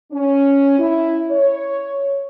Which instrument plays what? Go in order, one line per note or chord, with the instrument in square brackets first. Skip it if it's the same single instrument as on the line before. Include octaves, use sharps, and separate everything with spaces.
[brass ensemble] C#4
E4
C#5